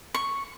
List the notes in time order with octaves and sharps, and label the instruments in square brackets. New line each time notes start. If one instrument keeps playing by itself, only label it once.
[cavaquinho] C#6